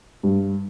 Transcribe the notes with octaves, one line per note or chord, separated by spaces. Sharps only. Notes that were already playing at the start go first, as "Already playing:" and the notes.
G2